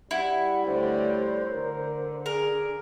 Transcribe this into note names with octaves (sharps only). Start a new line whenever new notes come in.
G3 E4 F#5
D2 D3 C5 C#5
D3 A#4
G#4 A#4